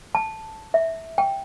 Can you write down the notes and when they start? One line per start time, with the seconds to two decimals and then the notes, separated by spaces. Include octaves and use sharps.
0.15 A5
0.74 E5
1.18 G5